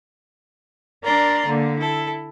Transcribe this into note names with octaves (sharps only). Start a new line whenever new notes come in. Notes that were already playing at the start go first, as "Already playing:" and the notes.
D4 A#4 D5 A#5 C6
D3 A#3
E4 A4